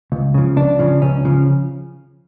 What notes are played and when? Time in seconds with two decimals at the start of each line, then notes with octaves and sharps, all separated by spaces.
0.12 C#2
0.34 C#3 F3
0.56 C#2 D4
0.79 C#3 F3
1.02 C#2 C#4
1.25 C#3 F3